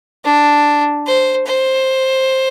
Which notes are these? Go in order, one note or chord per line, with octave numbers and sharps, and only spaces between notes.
D4
C5
C5